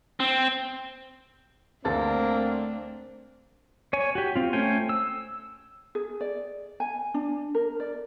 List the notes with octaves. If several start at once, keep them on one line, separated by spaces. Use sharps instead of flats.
C4
D2 A3 A#3 C4 D4 A4 A6
C#5 G#5
F#4 G4
C4 F4
A3 C#4 C5 G5 G#5
E6
G#4
D5
G#5
D4
A#4
D5